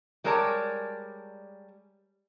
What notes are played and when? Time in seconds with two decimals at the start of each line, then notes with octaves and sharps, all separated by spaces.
0.24 G3 G#3 A#4 C#5 D5 A5